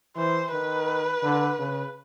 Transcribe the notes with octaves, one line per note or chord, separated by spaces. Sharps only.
E3 C5
D#3 B4
D3
C#3